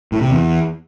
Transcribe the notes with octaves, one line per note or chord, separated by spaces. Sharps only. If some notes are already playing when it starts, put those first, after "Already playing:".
A2
C3
E2